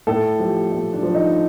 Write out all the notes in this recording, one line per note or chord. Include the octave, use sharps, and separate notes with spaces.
A2 A4
F3 G4
A2
D4
F3
D#4